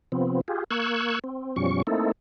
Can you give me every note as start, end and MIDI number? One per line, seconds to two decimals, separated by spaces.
0.12 0.41 48
0.12 0.41 53
0.12 0.41 59
0.12 0.41 60
0.48 0.64 65
0.48 0.64 67
0.48 0.64 68
0.71 1.19 58
0.71 1.19 85
0.71 1.19 88
0.71 1.19 90
0.71 1.19 92
1.24 1.56 60
1.56 1.82 42
1.56 1.82 47
1.56 1.82 53
1.56 1.82 55
1.56 1.82 61
1.56 1.82 85
1.87 2.12 57
1.87 2.12 58
1.87 2.12 60
1.87 2.12 63
1.87 2.12 64
1.87 2.12 69